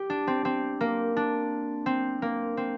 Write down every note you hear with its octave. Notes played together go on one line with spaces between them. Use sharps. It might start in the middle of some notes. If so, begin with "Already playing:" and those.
Already playing: G4
D4
C4
C4
A#3
D4
C4
A#3
C4